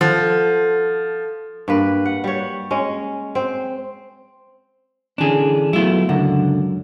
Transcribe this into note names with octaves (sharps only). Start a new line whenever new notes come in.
F3 A4 F#5
G2 A#3 B4
F#5
G3 C#5
G#3 C#4
C4
D3 E3 C#4 D4 G#4
F#3 A3 B3 E4 F4
C#2 F#2 D3 F#5